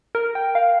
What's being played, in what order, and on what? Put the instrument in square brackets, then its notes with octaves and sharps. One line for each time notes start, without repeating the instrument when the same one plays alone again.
[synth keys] A#4
G5
F5